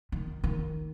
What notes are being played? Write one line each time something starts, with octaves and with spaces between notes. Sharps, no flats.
D#3
D#3